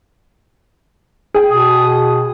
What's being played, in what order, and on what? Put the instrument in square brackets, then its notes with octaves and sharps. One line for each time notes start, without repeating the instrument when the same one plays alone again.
[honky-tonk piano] G#4 G5
[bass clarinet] B2 [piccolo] D#6